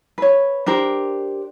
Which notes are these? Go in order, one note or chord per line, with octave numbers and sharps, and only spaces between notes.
B4 C#5
D4 G4 A#4 C5